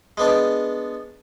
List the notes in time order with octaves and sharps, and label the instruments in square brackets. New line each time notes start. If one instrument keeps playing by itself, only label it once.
[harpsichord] G#3 B3 D4